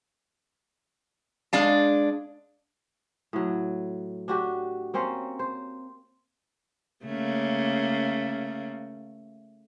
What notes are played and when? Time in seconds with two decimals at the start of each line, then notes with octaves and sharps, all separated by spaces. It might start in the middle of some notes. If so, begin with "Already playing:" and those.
1.53 G#3 D4 F5 A5
3.33 A2 F#3
4.28 D4 F#4 G4
4.94 A#3 C4 C#4 C5
5.39 C5
7.05 C#3 A3 A#3